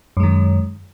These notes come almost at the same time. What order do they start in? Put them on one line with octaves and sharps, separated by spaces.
F#2 G#3 D#3